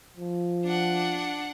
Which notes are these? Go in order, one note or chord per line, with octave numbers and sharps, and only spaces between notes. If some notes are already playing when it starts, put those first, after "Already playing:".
F3
D4 F#5